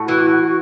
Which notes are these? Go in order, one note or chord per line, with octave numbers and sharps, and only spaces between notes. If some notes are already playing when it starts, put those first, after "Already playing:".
Already playing: A2 F#4
E3